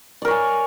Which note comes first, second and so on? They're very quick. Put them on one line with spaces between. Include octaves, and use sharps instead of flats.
D5 A#4 C#5 G#5